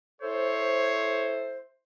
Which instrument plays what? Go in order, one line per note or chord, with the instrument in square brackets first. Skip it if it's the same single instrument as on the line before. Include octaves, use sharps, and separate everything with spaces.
[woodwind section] E4 A4 C5 [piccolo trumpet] C#5